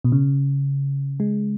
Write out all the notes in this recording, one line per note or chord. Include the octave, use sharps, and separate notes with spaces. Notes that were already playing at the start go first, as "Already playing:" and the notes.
B2
C#3
G#3